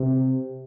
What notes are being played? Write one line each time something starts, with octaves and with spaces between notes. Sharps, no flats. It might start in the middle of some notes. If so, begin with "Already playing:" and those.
Already playing: C3